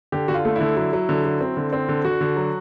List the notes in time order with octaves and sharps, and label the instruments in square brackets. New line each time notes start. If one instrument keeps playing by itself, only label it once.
[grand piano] D3 G4
D3 F#4
F4
A3
D3 E4
F#3 E4
F#3
D3
F#3
C4
D3
C4
D3
D3 F#4
D3
F#3